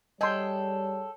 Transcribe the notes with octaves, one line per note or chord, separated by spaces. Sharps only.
G3 G#4 A4 C#5 D#5 G5 C6